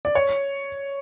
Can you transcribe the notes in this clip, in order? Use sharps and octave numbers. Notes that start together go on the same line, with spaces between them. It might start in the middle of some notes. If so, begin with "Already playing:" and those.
D5
C#5